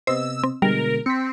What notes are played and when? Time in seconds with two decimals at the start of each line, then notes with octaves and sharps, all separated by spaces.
0.07 C3 B3 C5 D#5 E6
0.43 C4
0.62 B2 D3 G3 G#3 A#4
1.06 C4 B6 C#7